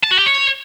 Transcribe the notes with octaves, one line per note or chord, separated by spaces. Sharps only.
A5
F#4
G4
C#5